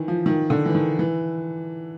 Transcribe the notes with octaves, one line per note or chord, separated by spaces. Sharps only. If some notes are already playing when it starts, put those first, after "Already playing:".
Already playing: D#3 E3
F3
D#3
D3
E3
D#3
E3